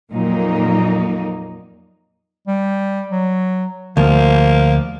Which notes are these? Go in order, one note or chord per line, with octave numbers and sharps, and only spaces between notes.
F2 A#2 F#3 A#3 D#4
G3
F#3
D2 F3 A#3